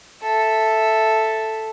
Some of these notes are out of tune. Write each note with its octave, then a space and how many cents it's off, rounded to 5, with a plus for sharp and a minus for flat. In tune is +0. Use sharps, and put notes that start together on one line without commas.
A4 +0 E5 +0